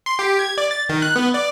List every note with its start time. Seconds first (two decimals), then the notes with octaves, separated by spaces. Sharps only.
0.06 C6
0.19 G4
0.39 G#6
0.58 D5
0.71 A6
0.89 D#3
1.02 F#6
1.16 B3
1.34 D5